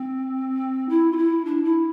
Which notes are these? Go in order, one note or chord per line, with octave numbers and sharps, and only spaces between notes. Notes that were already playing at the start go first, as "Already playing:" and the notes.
Already playing: C4
E4
F4
E4
D4
E4